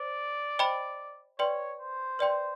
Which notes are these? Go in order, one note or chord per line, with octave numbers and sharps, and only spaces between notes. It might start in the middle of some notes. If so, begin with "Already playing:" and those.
Already playing: C5 D5
C5 D#5 G5 B5
B4 C#5 D5 G5 C6
C5
B4 D5 G5 C6